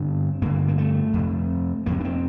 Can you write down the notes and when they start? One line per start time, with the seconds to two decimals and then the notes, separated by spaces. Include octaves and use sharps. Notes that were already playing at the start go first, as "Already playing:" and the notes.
Already playing: G2 D3 C4
0.42 G2 D3 A#3
0.68 A#3
0.78 A3
1.14 F2
1.19 C3
1.86 F2 C3 A#3
2.00 D4
2.04 C4